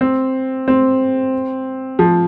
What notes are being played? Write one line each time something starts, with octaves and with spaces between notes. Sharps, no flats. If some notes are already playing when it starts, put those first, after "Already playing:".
C4
C4
F3